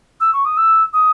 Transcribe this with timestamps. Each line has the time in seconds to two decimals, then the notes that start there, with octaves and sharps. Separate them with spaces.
0.21 E6
0.33 C#6
0.45 D#6
0.57 E6
0.93 D#6